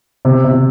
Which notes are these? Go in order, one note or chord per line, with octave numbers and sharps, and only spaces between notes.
C3
C3